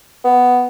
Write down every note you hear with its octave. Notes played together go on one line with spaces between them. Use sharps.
B3